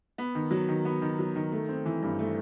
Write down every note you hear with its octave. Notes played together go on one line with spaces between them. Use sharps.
B3
D#3
F#3
D#3
B3
D#3
F#3
D#3
A3
C4
E3
G2
A3